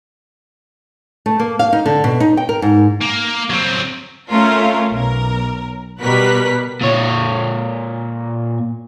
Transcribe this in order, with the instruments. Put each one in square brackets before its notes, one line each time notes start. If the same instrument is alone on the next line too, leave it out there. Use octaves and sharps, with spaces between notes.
[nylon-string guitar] A3
A#3
F5
D#4
D3
B2
D#4
G5
A#4
G#2
[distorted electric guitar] A#3
F#3 C4
[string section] A3 C#4 F4 A#4
B1 A#4
B2 G3 A#4 B4 F#6 B6
[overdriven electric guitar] A#2 C#5